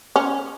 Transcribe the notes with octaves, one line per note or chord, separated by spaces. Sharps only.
C#4